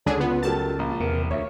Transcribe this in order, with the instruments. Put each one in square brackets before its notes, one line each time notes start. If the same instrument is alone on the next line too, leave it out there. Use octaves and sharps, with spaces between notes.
[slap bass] C#2 [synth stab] D3 D4 G#4 [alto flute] C#5
[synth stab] B3 [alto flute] F4
[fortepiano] F#3 A3 G4 [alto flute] A#4 [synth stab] A5
[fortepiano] A#1
[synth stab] E2 [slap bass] C3 [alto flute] A#4
[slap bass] D2 [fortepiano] C#5 [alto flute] E5